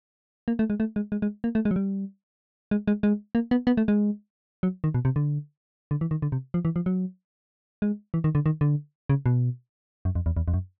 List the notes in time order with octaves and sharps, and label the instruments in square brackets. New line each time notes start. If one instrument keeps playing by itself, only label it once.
[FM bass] A#3
A3
G#3
A3
G#3
G#3
G#3
A#3
A3
G#3
F#3
G3
G#3
G#3
G#3
A#3
B3
B3
A3
G#3
F#3
D#3
B2
C3
D3
D3
E3
D#3
D3
C3
F3
E3
F3
F#3
G#3
E3
D#3
D3
D#3
D3
C#3
B2
F#2
F2
E2
E2
F2
F#2